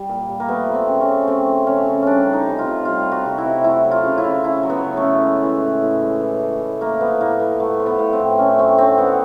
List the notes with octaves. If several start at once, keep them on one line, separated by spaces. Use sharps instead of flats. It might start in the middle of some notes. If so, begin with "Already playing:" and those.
Already playing: G3
A#2
G3
A#3
A3 B3
F3
C4
C#3
C#4
C#3
A3 C4
F3
C#3 C#4
C#3
G3 C#4 D4
D#3
D#4
C3
F4
C3
G3 F4
D#3
F#4
C3
E4
C3
A3 E4
F#3
F4
C#3
E4
C#3
A3 E4
F#3
B3
C#3
A3
C#3
G#3
E3
A2
A2
G#3
E3
A2
A2
A3 A#3
F3 B3
A2 A#3
A2 B3
A3 B3
F3
B3
A2
C4
A2
A3 C#4
F#3 C4
D3 C4
D3 B3